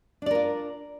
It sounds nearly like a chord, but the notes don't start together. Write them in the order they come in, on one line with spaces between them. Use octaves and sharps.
D4 D5 A#4 F4